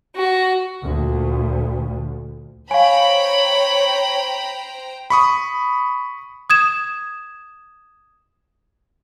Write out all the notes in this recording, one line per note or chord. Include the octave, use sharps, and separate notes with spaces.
F#4
D2 A#2
C5 C#5 F5 G5 G#5 A#5 B5
B5 C#6 D#6
D#6 G#6 E7